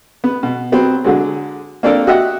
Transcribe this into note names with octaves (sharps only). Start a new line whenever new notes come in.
B3
B2
F#3 B3 C4
D3 F#3 G#3
A#3 C4 D4 F4 A4 A#4
F#4 G4 D#5 E5 F#5